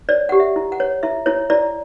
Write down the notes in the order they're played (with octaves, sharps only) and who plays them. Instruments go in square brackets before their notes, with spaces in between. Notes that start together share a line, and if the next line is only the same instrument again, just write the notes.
[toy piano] C#5 D5
G4 F#5
E5
E4
F#5
C#5
E4 E5
E4 C#5
E4 D5